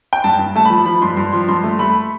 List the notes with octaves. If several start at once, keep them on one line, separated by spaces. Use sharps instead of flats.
G5
G2 A5
G2
A3 A5
F3 B5
F3 B5
G2 C6
G2 C6
F3 C6
G2 C6
A3
A3 B5